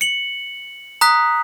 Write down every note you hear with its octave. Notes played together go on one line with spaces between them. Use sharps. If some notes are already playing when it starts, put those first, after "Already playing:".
C#7 F#7
A#5 D#6 F#6 B6